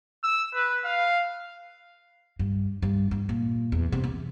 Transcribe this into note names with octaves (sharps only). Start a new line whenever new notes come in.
E6
B4
F5
G2
G2
G2
A#2
E2
C3
E2